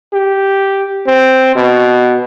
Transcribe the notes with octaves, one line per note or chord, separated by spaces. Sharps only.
G4
C4
B2